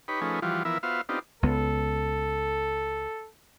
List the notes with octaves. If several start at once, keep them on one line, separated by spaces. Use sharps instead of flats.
D#4 G4 B4 C#5 B5
F3 A3 C#4 D#4 G#4 B4
E3 F3 G3 F4 F#4
E3 F3 B3 E4 A#4 E5
B3 F4 F#4 C5 E5 F5
B3 C4 D4 D#4 F4 G4
C#2 B3 A4